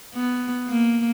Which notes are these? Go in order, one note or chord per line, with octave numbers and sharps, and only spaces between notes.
B3
A#3